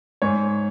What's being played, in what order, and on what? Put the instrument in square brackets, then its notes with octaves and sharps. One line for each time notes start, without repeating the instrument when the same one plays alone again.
[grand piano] G#2 C#5